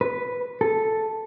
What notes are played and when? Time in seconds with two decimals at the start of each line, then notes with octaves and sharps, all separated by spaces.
0.01 B4
0.61 A4